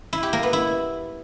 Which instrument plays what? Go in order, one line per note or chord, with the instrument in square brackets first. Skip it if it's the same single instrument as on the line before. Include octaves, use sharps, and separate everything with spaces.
[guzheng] E4
G4
A#3
B3
E4